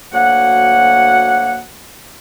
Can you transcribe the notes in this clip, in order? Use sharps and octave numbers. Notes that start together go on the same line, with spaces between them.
D2 F#3 A#3 F#5